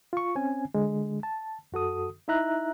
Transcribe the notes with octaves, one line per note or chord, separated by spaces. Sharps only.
F4 C#6
C4 C#4 G#5
D3 G#3
A5
F#2 F#4 A4 D#6
D#4 E4 E5 A#5 F#6